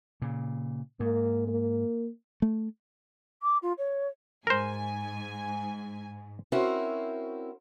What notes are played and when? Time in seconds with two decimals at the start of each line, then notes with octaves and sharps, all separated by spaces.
0.22 A#2 C#3
1.00 G#2 A#3
1.47 A#3
2.42 A3
3.42 D6
3.62 F4
3.78 C#5
4.47 G#2 A#4 C5 G#5
6.52 C4 C#4 E4 F#4 A#4 C5